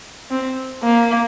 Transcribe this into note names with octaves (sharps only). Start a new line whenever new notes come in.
C4
A#3